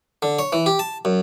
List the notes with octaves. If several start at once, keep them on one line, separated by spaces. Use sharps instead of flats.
D3
C#5
E3
G4
A5
F#2